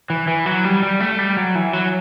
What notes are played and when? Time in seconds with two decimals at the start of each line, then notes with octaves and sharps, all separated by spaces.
0.10 E3
0.28 E3
0.46 F#3
0.64 G3
0.83 G3
1.00 A3
1.19 G3
1.37 F#3
1.55 E3
1.73 F#3